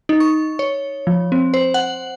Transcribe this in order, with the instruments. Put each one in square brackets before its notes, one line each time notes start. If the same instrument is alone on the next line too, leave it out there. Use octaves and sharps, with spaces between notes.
[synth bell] D#4
C#6
C#5
F3
C4
C5
F#5